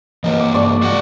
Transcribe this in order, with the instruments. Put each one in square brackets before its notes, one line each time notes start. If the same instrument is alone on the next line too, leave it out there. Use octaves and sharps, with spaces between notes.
[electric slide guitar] E3 A#3 [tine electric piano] B4 C#5 D#5
[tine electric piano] D6
[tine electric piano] G2 G#3 C#6 [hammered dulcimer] D5
[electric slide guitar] F#4 G#4 F#5